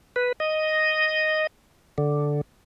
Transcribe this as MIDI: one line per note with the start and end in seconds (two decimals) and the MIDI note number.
0.16 0.32 71
0.40 1.47 75
1.98 2.41 50